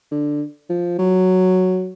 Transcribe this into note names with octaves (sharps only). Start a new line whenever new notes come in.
D3
F3
F#3